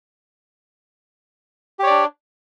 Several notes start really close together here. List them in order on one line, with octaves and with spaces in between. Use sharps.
G4 C#5 D5 D4